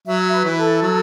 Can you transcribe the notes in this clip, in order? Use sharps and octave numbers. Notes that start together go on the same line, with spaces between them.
F#3 E5
B4
E3
A4
F#3